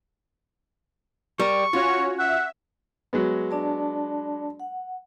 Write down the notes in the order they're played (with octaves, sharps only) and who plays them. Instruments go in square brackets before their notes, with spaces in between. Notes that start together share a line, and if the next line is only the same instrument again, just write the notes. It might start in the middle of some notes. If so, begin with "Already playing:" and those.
[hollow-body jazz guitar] G3 A#4 [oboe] C#6
[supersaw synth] C#4 F#4 C#5 [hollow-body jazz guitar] F4
[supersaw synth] E5 [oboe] F#5
[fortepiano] F#3 G#3 B3
[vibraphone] D4 D5 A5
F#5